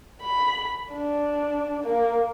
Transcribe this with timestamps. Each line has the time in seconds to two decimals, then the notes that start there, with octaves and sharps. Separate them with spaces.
0.21 B5
0.92 D4
1.83 A#3